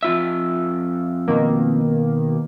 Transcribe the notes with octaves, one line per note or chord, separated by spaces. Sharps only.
F2 F4 E5
B2 D#3 A#3